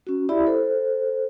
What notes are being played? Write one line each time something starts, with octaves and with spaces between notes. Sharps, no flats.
C#4 F#4
E4 G4 D5 E5 B5
A4 C5